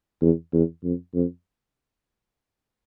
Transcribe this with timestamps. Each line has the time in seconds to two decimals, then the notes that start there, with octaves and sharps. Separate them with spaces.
0.22 E2
0.53 E2
0.84 F2
1.14 F2